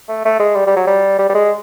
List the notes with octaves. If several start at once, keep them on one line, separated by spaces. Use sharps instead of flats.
A3
A3
G#3
G3
G3
F#3
G3
G3
G3
G#3